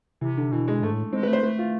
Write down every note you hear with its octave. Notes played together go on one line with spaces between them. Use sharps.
C3 E3
D3
B2 E3
G#3
G#2 A3
A2
G#3 C4
B4
A3
C5
A3 B4
F4